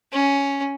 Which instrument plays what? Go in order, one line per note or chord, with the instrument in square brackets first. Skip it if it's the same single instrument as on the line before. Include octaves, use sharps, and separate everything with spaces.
[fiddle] C#4